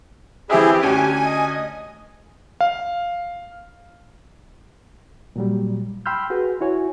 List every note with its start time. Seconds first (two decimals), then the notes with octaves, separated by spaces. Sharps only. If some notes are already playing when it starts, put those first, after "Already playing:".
0.50 E3 C4 E4 G4 G#4 E5
0.81 D2 C#4 G#5
1.23 D#5
2.61 F5
5.36 A#2 F#3 G3
6.06 G5 B5 C6 E6 F6 G6
6.30 F#4 G#4 B4
6.61 E4 F#4 C#5 G#5